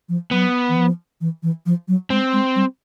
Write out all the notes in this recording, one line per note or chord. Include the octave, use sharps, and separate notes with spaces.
F3
F#3 B3
E3
F3
E3
E3
F3
F#3
G#3 C4
G#3
G3